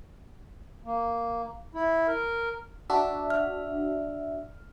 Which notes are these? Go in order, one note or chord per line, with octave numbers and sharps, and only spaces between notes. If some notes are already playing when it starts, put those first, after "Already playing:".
A#3
E4
A#4
D4 F#4 E5
F6